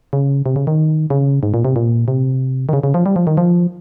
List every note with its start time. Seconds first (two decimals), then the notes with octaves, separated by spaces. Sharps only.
0.13 C#3
0.46 C3
0.56 C#3
0.67 D#3
1.10 C#3
1.43 G#2
1.54 A#2
1.65 C3
1.76 A#2
2.08 C3
2.69 D#3
2.73 C#3
2.83 C#3
2.94 F3
3.06 G3
3.16 F3
3.27 D#3
3.37 F3